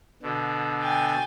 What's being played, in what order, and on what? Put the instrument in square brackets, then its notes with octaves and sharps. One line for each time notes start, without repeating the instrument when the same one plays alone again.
[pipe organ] B2 D3
[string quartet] G5 G#5 A6